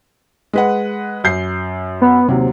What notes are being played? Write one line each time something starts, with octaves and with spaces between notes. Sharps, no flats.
G#3 B4 F#5
F#2 G6 C7
B3
D#2 C3 F#3